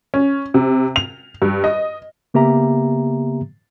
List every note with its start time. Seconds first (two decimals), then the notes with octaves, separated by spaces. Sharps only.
0.14 C#4
0.54 C3
0.96 F7
1.42 G2
1.64 D#5
2.34 C#3 A#3 B3 G4 E5 A#5